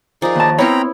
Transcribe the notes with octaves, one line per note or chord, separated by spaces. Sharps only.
F3 D#4 G#4 A#4 D5
D#2 A5
B3 C4 E4 C#5 G5 A#5 B5